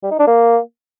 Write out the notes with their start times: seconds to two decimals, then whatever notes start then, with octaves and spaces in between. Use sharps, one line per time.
0.03 G3
0.11 D#4
0.19 D4
0.27 A#3